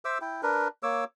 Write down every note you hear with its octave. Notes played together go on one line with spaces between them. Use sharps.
C5 E5 D6 E6
E4 G5
D4 A#4 B4
A#3 C#5 D6 E6